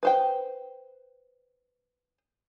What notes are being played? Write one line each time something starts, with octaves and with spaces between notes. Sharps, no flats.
B4 C5 G5